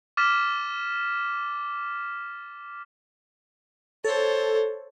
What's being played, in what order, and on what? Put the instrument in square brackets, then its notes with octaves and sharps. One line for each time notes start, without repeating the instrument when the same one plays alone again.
[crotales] D6 F6 A6 B6 E7
[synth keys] A4 [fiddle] C5 C#5